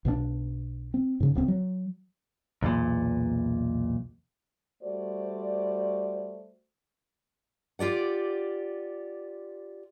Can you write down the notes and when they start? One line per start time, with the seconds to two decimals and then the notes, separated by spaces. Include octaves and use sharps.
0.05 B1 B2 F3 D4
0.94 C4
1.20 G#2 C#3
1.35 D1 C#2 C4
1.48 F#3
2.63 B1 E2 A#2
4.83 G3 A3 F#4 C5 D5
7.79 F4 G4 D5 F#5